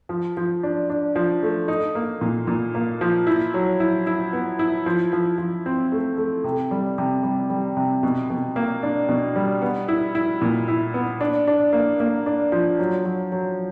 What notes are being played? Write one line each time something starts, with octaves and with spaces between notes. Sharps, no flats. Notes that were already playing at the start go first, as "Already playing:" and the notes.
F3
F3
D4
D4
F3
A3
D#4
A#3
A#2
A#2
A#3
F3
E4
F#3
E4
E4
B3
E4
F3
F3
F3
C4
A3
A3
C3
G3
C3
G3
G3
C3
B2
B2
A#3
D4
B2
G3
B3
E4
E4
A#2
E4
B3
D4
D4
A#3
A#3
D4
F3
F#3
F#3
F#3